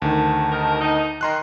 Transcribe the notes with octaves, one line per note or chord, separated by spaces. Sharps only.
D2 D#3 A5
D#4 G4 A#4
D#4
D#3 A#5 C6 F#6